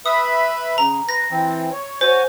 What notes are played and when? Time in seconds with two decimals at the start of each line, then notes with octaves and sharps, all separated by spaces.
0.06 B4 E5 B5 D#6
0.78 C#3 A#5
1.09 B4 A#6
1.31 E3 C4
1.72 C#5
2.01 F#4 C5 C#5 G#5